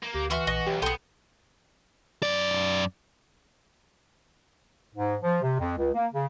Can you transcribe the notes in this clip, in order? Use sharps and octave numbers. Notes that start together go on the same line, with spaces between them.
A#3
D2 G4
E3 F#4 E5 C6 F6
A#1 D#5 C#6
B1 G4
B1 B3 G#4 A4 G5 C6
F#2 D5
G#2
F3
C3
F2
C#2
A#3
C#3